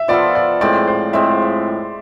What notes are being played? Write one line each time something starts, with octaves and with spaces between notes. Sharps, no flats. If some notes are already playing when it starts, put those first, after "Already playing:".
Already playing: E5
F3 B3 F4 A4 D5
D5
A2 G#3 C4 D5
C5
A2 G#3 C4 E5